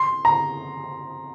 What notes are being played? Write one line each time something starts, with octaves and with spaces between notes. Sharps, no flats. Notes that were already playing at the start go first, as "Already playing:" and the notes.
Already playing: C6
A#5